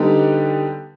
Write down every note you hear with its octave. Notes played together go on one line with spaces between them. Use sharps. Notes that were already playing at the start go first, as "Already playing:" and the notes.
Already playing: D3 G3 B3 D#4 G4